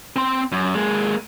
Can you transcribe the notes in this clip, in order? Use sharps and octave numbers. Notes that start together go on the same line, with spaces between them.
C4 C6
F#2
G#3 A#3